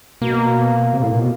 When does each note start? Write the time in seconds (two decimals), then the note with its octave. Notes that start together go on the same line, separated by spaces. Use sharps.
0.21 B2 A#3
0.94 C3
1.03 A2
1.12 A#2
1.21 B2